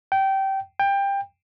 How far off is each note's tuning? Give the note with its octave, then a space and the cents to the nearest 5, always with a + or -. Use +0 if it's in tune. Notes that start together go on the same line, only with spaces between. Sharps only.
G5 -20
G5 +20